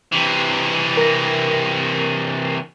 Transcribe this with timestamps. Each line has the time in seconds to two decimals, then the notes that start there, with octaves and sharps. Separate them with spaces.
0.12 C3 E3
0.97 A#4 A#6